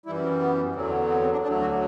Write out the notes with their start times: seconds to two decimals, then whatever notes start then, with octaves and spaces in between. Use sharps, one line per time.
0.06 G3 E4
0.09 F#2 E3
0.23 C4
0.41 B3
0.75 E2 D3 F#3 C4
1.10 C4
1.21 C4
1.32 D4
1.43 D2 D3 F#3 D4
1.61 F#4